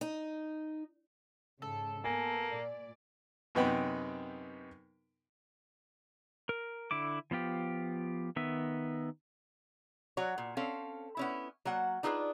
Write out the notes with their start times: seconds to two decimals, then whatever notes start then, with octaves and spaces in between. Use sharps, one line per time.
0.01 D#4
1.62 G#2 C#3 A4
2.04 A#3 B3 G#5
2.50 A#2 D5
3.55 F#2 C3 B3 D#4 G5 B5
6.49 A#4
6.91 D3 E4 D6
7.31 F3 B3 F4 G4
8.36 D#3 B3 E5
10.17 F#3 F#4 C#5
10.38 A#2
10.57 C4 C#4 A4 F5
11.17 B3 C#4 E4
11.65 F#3 A#3 F#5
12.03 D4 D#4 F4 G#4 A4 B4